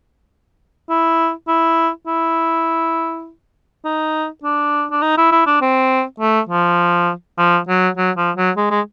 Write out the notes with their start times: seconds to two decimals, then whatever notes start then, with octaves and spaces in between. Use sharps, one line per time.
0.90 E4
1.48 E4
2.07 E4
3.85 D#4
4.44 D4
4.92 D4
5.02 D#4
5.18 E4
5.32 E4
5.47 D4
5.62 C4
6.20 A3
6.49 F3
7.38 F3
7.68 F#3
7.98 F#3
8.17 F3
8.37 F#3
8.57 G#3
8.71 G#3